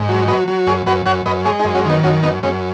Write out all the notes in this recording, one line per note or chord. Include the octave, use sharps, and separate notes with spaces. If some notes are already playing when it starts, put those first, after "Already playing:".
Already playing: G#2
F#3
F#3 B4 D#5
F#3
F#2 G#4 C#5
F#2 F#4 B4
F#2 C#5 F#5
F#2 B4 D#5
G#3 G#4 C#5
D#4 G#4
F#2
C#4 F#4
D#3 B3 D#4
F#2 C#4 F#4
F#2 B3 D#4
F#2 G#3 C#4